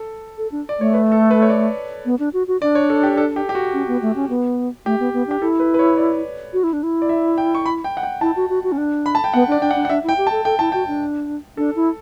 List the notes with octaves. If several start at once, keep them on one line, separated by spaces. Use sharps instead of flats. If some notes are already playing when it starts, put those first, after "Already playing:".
Already playing: A4
A4
D4
D5
A3 C#5
B4
A4
B4
C#5
D5
B3
D4
F#4
F#4
D4 D5
C#5
A4
G4
A4
G4
G4
F#4
C#4
B3
A3
C#4
B3
A3 G4
B3
B3
D4 G4
E4 A4
B4
B4
C#5
D5
F#4
E4
D4
E4
D5
E5
G5
C#6
B5
G5
F#5
G5
E4 A5
F#4
F#4
F#4
C#4
D4
B5
A5
G5
B3 F#5
D4 D5
D4 G5
F#5
D4
F#5
D4 E5
E4
G5
G4
A5
A4
A4 G5
E4 A5
F#4 G5
D4
D4 A4
E4